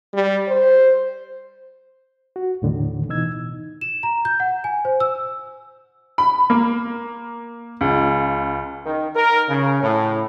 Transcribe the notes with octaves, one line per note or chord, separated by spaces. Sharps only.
G3
C5
F#4
D#2 A2 D3 D#3
B2 E3 D#4 E6 G#6
E7
A#5
G6
F#5
G#5
C5
E6
B5
A#3
C#2
D#3
A#4
C#3
A2